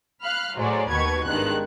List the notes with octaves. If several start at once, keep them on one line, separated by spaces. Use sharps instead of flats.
F5 B5 F6 F#6
A2 F#3 G#3 C5 D5
D#2 B2 D#3 B4 C#6 G#6
G#1 G2 D#3 G#3 B3 F#6